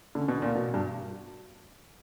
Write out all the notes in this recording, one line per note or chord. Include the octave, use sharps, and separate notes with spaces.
D3 C#4
B2
D4
A#2
B2 F#4
G2